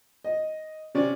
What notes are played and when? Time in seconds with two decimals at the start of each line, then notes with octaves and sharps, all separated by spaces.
0.24 D#5
0.95 C3 C#4 D5